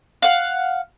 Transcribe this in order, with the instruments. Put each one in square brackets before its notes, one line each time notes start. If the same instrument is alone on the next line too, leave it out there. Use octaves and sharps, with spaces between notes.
[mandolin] F5 F#5